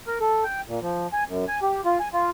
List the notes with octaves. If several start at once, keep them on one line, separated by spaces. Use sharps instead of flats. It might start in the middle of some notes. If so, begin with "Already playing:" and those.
A#4
A4
G5
A#2
F3
G#5
F#2
G#5
G4
F4
G#5
F4